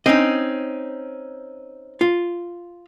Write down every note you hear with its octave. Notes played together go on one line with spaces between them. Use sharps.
C4 C#4 D#4 D#5
F4